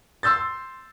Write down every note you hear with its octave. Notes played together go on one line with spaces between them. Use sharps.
C6 E6 G6 A6